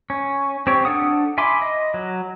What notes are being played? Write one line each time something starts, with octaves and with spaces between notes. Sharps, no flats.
C#4
C4 G4 C#5
D4 A4 F#5 D#6
E5 G#5 B5 C6 D6
D#5
F#3